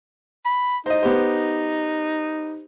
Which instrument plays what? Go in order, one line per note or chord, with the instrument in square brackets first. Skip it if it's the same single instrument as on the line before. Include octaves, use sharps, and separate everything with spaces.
[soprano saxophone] B5
[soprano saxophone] D#4 [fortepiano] C5 D#5
[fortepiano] B3 G4 C5